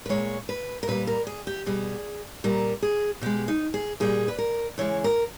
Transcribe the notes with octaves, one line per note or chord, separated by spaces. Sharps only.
B4
A#2 G#3 C#5
B4
A#4
A#2 G3 B4
A#4
G#4
G4
B2 G3 G#4
A#2 G3 A#4
G#4
B2 G#3 G4
D#4
G#4
A#2 G3 G#4
B4
A#4
C#3 E3 G#3 C#5
A#4